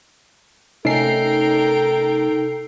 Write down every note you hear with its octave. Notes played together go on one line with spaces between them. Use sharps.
C3 A3 C#4 D#4 A4 A#4 G5 C7